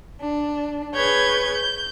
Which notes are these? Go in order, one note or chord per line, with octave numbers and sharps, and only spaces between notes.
D4
G#4 B4 C#5 G6 G#6
G6